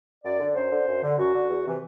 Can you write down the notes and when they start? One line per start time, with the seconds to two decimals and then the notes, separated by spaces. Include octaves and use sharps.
0.24 F#2 D5
0.40 D3
0.55 F#2 C5
0.71 D3
0.86 F#2
1.03 D3
1.19 F#2 F#4
1.34 D3
1.50 E2
1.66 C3 E3